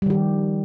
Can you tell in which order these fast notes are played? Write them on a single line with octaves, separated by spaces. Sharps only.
G3 D#3 G4 F3